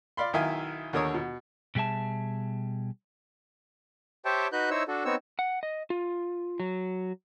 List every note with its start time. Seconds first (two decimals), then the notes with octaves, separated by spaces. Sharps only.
0.17 D5 F5 B5 C6
0.33 B1 D#3 E4 E5 F5 G#5
0.93 D#2 D3 A#4 C#5 D#6
1.14 B2
1.75 B2 G3 G#4 E5 A5
4.25 G4 C5 C#5 E5 G5 A5
4.52 D#4 F#4 B4 F#6 G6
4.71 D#4 E4 C5 C#5 E6
4.88 D4 F#4 A4
5.05 B3 C4 D#4 C#5 E6
5.39 F#5
5.63 D#5
5.90 F4
6.60 F#3